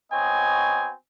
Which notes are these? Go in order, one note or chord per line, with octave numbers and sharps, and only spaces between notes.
B3 C4 F#4 C#5 D#5 G#5